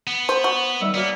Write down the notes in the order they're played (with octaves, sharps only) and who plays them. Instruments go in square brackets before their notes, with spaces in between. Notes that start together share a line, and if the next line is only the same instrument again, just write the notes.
[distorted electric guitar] B3
[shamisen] C5
F#4
[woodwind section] D#3 G3 E5
[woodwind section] F#2 G3 A#3 [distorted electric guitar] B3